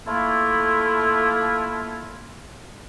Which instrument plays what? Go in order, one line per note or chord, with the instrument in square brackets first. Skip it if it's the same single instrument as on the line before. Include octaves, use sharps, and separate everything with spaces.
[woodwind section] A3 A#3 E4 F4